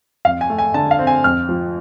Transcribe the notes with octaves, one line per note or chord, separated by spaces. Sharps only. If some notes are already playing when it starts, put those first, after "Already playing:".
F2 F5
G#5
A3
G#5
D3 A5
F5
C4
G#5
F2 F6
F3